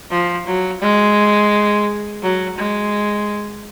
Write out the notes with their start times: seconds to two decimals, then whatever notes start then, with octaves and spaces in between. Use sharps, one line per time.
0.10 F3
0.46 F#3
0.81 G#3
2.22 F#3
2.58 G#3